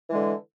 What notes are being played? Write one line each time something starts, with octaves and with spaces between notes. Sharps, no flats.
D3 E3 G#3